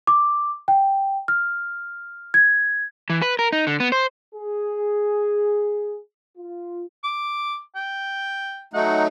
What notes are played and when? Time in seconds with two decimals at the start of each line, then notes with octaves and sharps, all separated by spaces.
0.07 D6
0.68 G5
1.28 F6
2.34 G#6
3.10 E3
3.22 B4
3.39 A#4
3.53 D#4
3.67 D3
3.80 B3
3.92 C5
4.35 G#4
6.38 F4
7.04 D6
7.75 G5
8.74 F#3 A3 D#4 F#5